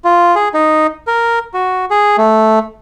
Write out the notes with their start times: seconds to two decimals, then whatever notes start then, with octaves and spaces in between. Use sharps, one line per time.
0.05 F4
0.36 G#4
0.54 D#4
1.07 A#4
1.54 F#4
1.91 G#4
2.18 A3